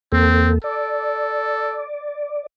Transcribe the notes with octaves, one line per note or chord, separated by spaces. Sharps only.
E2 A#3 C4 A4
A4 D5